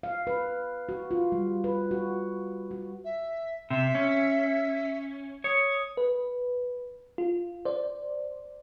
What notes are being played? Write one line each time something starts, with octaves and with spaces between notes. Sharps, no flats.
F5
B4
F#4
F4
G3
B4
F#4
F#4
E5
C3 E5
C#4
C#5 D#6
B4
F4
C5 D5